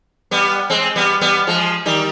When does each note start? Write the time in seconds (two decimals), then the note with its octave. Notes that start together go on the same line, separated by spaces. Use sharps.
0.31 G3 B3
0.70 G#3 C4
0.96 G3 B3
1.21 G3 B3
1.47 F3 G#3
1.85 D#3 G3